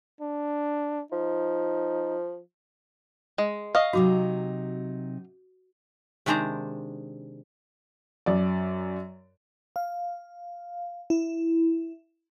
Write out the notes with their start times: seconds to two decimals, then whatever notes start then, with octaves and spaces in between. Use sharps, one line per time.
0.21 D4
1.12 F3 D#4
3.38 G#3
3.75 D#5 F5 C#6
3.93 C3 F#3 D#4 F#4 D6
6.26 C3 D#3 G#3 D4 C5 A#5
8.26 F#2 D5
9.76 F5
11.10 E4